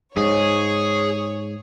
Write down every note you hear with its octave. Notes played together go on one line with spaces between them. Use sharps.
G#2 G#4 C#5